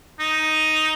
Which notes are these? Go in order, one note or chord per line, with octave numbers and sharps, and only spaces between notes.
D#4